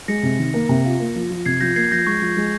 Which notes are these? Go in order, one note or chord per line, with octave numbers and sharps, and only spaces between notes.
G#3 A#6 C#7
C3
D#3
A#3
C3
F4
A#3
F3
F3
C3 G#6 C7
F3 G6 A#6
A#3 G#6 C7
F3 G6 A#6
G#3 C#6
F3
G#3